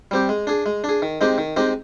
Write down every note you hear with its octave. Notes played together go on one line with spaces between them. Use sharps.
G3 C4 G4
G#3
D4 G#4
G#3
D4
G#4
D#3
G#3 C4 D#4 G4
D#3
G#3 C4 D#4 G4